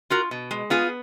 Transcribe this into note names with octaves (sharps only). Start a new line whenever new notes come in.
F4 F#4 A#4
B2
G#3
B3 F4 G#4